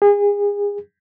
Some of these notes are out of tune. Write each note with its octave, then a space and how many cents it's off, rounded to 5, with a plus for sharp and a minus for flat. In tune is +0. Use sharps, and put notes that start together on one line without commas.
G#4 -30